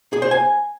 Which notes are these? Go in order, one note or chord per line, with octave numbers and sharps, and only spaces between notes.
G#4
C5
G#5